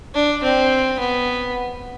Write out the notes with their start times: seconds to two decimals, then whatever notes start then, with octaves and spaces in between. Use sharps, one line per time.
0.14 D4
0.43 C4
1.00 B3